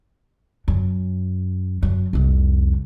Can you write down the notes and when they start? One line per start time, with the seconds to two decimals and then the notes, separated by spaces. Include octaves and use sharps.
0.68 F#2
1.83 F#2
2.13 C2 F2